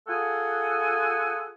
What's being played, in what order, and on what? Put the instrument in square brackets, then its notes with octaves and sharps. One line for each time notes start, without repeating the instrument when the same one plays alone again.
[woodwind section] F4 G#4 A4 F#5 G#5